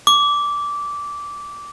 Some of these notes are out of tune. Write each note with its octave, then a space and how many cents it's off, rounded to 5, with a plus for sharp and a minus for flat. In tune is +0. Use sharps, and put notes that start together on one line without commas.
D6 -15